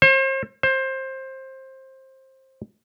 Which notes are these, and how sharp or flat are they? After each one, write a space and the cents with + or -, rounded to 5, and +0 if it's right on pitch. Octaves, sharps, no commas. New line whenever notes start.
C5 +40
C5 +20